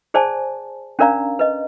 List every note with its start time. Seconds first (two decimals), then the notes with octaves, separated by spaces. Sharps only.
0.14 G#4 C5 D5 G#5 A5
0.99 C#4 D4 A#4 D5 F5 A#5
1.39 B4 D#5